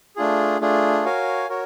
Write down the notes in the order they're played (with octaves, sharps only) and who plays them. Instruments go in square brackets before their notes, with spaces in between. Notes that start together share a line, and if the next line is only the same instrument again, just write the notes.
[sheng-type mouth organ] A3 D4 F4 G#4
A3 D4 F4 G#4
F#4 A#4 C#5 F5 G#5
F#4 A#4 C#5